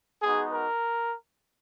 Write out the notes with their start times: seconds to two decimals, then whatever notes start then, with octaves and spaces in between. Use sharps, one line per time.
0.22 G#3 B3 D#4 F#4 G#4
0.53 A#4